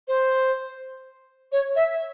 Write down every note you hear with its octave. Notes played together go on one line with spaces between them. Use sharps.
C5
C#5
E5